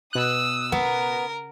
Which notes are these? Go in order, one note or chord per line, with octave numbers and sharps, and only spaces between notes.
B2 D#6 E6 F#6
C#3 B3 A#4